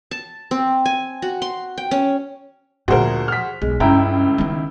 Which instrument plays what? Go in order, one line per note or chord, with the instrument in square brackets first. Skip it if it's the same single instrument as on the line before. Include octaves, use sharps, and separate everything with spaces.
[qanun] A5
C4
G#5
F#4
C6
G5
C#4
[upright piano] D2 A#4 [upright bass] A#2 F3 [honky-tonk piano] F#4 G#4 C5
[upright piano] F6 B6
[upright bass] B1 [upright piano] G#3
[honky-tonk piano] C#2 C#3 [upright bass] G2 [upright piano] E4 G5 A#5
[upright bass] D#3 B3